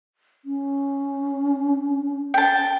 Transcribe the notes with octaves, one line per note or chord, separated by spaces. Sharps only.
C#4
G5 A5